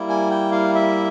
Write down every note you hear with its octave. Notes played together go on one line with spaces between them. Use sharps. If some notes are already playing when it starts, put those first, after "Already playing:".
Already playing: G3 A#3 E4
G#5
G5
F5
E5